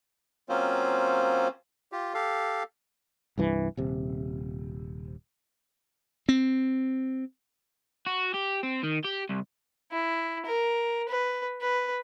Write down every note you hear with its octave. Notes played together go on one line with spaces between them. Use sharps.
F#3 A#3 C4 C#4 F4 C5
F4 G4
G4 A4 F5
C2 G2 E3
D#1 C3
C4
F#4
G4
C4
D#3
G4
C2
E4
A#4
B4
B4